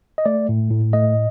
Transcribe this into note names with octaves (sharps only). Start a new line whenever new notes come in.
D#5
A3 D5
A2
A2
A3 D#5